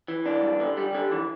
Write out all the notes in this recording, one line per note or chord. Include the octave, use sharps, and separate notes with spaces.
E3
D4
G2
D3
G3
D3
E3